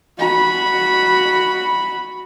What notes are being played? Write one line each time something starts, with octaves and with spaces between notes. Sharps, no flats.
F#4 B5